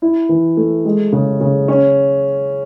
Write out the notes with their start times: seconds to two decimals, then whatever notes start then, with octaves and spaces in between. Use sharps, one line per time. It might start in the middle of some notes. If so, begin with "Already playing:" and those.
0.02 E4
0.29 E3
0.57 A3
0.85 G#3
1.12 C#3
1.41 C#3
1.68 C#4